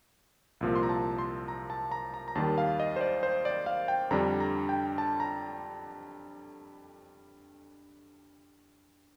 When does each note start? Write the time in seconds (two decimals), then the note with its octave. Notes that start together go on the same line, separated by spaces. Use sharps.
0.61 C2 A#2 F3
0.76 C6
0.83 A#5
0.89 A5
1.18 C6
1.48 A#5
1.70 A5
1.92 A#5
2.14 A#5
2.28 A#5
2.35 D#2 D#3 G3 A5
2.58 F5
2.80 D#5
2.96 C5
3.01 D5
3.23 C5
3.45 D5
3.66 F5
3.88 G5
4.11 F2 D3 G3 D4 A#5
4.40 A#5
4.69 G5
4.98 A5
5.20 A#5